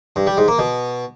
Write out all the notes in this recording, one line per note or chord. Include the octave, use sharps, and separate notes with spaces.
G2
G3
G#2
A#3
B2